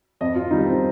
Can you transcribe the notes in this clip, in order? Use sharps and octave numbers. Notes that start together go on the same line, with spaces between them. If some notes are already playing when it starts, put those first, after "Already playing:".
F2 D#5
F4
D#3 G3 D#4
C4